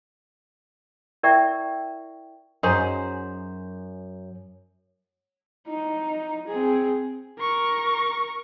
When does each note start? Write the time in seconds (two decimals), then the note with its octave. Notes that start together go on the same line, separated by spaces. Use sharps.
1.23 E4 A#4 D5 E5 G5 C#6
2.63 F#2 D#4 G#4 C5
5.68 D#4
6.48 C4 G#4
7.38 A#4 C#6